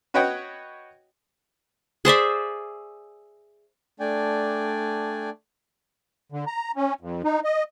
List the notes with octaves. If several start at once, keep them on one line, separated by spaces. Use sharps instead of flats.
F#4 B4 C#5 D#5 F#5 G5
G#4 C5 D5 E5
A3 D4 D5 G5 G#5
D3
A#5
C#4
F2
D#4
D#5